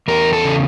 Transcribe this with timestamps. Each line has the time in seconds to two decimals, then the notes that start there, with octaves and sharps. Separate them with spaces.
0.08 E2 A#4
0.33 A4
0.44 C#3